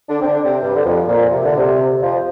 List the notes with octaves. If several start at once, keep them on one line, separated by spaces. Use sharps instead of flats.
D3 D4
C4
D3 D4
C3 C4
G2 G3
D3
F2 F3
A#2
C3
D3
C3
F2 F3